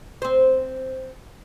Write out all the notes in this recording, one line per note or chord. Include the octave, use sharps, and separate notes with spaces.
C4 C5